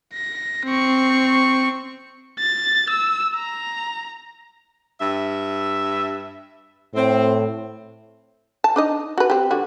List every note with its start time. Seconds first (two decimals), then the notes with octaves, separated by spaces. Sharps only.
0.14 A#6
0.66 C4 C#6
2.39 A6
2.90 E6
3.35 A#5
4.99 G2 E5
6.95 A2 C4
8.64 A5
8.76 D4 D#4 D#5
9.18 F#4 B4
9.30 C4 G4
9.51 D3 G3 F#4